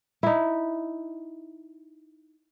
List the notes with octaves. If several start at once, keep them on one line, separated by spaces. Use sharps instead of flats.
D#4 E4